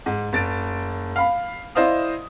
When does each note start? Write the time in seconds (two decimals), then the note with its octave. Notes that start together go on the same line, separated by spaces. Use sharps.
0.06 G#2
0.33 F#1 A6 D7
1.16 F5 B5
1.75 E4 C5 D5 D#5 F5 D#6